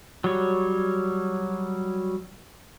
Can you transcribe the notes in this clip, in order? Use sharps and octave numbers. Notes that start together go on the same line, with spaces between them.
F#3 G3 C#5